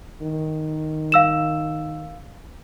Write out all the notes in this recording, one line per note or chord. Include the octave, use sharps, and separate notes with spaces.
D#3
F5 E6 E7